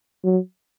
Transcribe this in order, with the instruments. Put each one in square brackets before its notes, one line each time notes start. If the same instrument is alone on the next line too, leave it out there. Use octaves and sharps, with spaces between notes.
[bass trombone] F#3